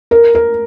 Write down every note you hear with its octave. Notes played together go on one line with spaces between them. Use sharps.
A#4
A#4